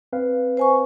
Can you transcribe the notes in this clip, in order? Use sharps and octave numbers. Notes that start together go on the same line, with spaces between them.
C4 B4 F5
C5 G#5 C#6